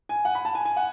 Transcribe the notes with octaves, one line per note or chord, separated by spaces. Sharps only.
G#5
F#5
B5
A5
G#5
G#5
F#5